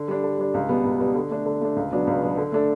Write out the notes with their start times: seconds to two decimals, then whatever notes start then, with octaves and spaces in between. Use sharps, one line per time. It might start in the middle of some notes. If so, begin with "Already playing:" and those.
Already playing: D3
0.08 G3 D4
0.23 D3
0.38 G3 D4
0.54 C#2
0.69 B2 G3 B3
0.85 C#2
1.00 B2 G3 B3
1.15 D3
1.31 A3 D4
1.46 D3
1.61 A3 D4
1.76 C#2
1.91 B2 F#3 B3 D4
2.07 C#2
2.22 B2 F#3 B3 D4
2.38 D3
2.52 A3 D4 A4